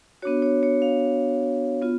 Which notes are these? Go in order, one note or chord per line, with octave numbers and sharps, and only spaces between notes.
B3 D4 F#4 C#5
C#5
C#5
F5
B3 F4